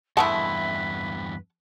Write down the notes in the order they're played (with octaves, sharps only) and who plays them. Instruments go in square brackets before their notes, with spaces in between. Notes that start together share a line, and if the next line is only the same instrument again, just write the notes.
[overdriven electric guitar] E2 G2 [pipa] G#3 A3 E4 [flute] B4 [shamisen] F#5 A5